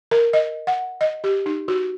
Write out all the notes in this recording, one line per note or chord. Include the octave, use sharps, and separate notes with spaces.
A#4
D#5
F#5
D#5
G4
D#4
F#4